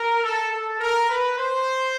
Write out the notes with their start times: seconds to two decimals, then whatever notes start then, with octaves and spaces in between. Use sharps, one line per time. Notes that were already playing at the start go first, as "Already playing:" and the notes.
Already playing: A#4
0.23 A4
0.52 A4
0.80 A#4
1.09 B4
1.38 C5